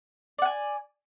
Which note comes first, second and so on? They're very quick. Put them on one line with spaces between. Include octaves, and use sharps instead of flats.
D5 F#5 G#5